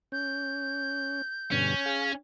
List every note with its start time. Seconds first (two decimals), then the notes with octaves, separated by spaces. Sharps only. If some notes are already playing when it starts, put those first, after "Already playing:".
0.12 C#4 G6
1.52 G2 B2 D3 C#4
1.86 G#4 F5